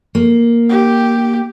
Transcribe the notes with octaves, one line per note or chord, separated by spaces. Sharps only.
A#3
G4